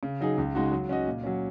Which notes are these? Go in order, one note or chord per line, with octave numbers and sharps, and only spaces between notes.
C#3
F#3 D#4 G#4
C#2
C#3 G#3 D#4 F#4
F#3
C#4 F#4 D#5
A#2
F#3 C#4